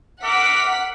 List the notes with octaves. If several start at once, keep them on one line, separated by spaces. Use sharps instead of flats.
A#4 E5 F#5 D6 B6